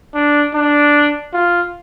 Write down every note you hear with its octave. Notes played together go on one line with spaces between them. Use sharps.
D4
D4
F4